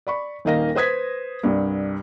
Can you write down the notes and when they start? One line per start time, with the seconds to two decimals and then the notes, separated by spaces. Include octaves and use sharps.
0.07 D5 B5 C#6
0.45 D#1 D#3 A#3 D#5 F5 A#6
0.75 B4 C5 D#6 G#6 B6
1.43 C2 G2